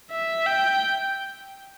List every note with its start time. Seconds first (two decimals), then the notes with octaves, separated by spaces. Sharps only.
0.11 E5
0.47 G5